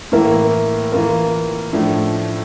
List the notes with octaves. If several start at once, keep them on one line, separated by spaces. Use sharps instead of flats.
A2 E3 A#3 E4 A#4
E3 A#3 F4 A#4
A2 F3 A3 D4